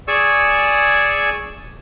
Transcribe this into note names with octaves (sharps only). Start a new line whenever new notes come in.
G#4 D5 G#5 C#6 E6